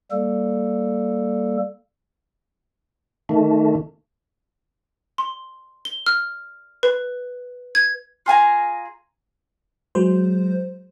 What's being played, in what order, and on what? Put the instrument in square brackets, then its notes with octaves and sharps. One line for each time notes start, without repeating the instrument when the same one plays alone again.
[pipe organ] G3 A#3 A4
[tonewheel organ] D#3 A3
[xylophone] C6
G7
F6
B4
G#6
[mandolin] F4 G#4 G#5 A#5
[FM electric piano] F#3 G#3 C5